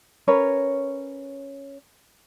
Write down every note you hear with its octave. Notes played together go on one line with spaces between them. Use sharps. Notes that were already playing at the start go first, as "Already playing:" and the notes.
C#4 A#4 B4 C#5